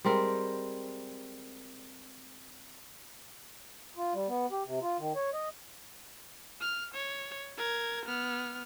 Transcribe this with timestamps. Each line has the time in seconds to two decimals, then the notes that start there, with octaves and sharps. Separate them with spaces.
0.04 G3 G#3 C4 A#4
3.97 F4
4.14 G3
4.28 B3
4.51 G4
4.66 C3
4.82 F4
4.99 D#3
5.16 C#5
5.33 D#5
6.61 F6
6.94 C#5
7.57 A#4 G#6
8.06 B3 F6